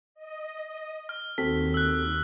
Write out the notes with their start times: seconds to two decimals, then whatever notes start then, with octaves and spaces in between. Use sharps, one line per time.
0.15 D#5
1.09 F6
1.38 D#2 C4 F#4 A4 B6
1.74 E6 F#6